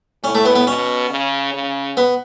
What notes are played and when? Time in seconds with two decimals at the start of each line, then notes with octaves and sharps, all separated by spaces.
0.23 A2 C#4
0.35 A3
0.45 B3
0.55 B3
0.67 B2 C#4
1.10 C#3
1.53 C#3
1.97 B3